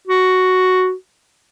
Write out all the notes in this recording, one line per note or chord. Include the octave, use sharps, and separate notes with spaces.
F#4